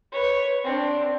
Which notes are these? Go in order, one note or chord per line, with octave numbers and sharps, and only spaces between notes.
B4 C#5
C4 D4